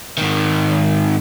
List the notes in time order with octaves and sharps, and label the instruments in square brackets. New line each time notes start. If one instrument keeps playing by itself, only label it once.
[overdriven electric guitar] G#2 D#3